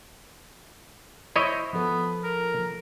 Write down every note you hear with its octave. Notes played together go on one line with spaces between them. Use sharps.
E4 C5 C#5 D#5
F3 B3 F4 A4
A#4